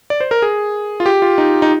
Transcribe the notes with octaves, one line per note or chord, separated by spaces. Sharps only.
D5
C5
A#4
G#4
F4
G4
F4
D#4
D#4